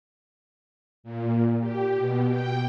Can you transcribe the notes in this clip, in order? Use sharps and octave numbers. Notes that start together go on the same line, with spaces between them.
A#2
G4
B2
G5